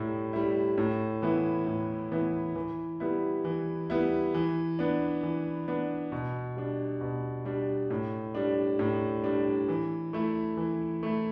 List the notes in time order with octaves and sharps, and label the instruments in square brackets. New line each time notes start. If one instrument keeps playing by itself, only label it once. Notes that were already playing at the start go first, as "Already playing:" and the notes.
Already playing: [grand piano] A2 G3 E4
G3 E4
A2
E3 B3 E4
A2
E3 B3 E4
E3
G3 B3 E4
E3
G3 B3 E4
E3
B3 D4
E3
B3 D4
B2
G3 D4
B2
G3 D4
A2
G3 D4
A2
G3 D4
E3
A3 E4
E3
A3 E4